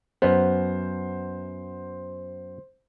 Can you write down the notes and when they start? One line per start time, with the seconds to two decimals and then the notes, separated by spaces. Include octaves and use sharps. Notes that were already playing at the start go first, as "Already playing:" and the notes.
0.22 F#2 B3 C5